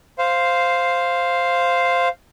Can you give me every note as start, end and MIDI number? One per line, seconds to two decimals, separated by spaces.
0.19 2.08 72
0.19 2.08 77